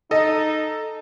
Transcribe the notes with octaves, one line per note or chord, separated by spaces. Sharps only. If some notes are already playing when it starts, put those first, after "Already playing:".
D#4 A4 D#5